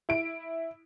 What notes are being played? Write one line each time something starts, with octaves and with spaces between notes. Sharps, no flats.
E4 D7